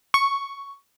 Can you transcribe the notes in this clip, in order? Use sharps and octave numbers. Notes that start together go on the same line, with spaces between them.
C#6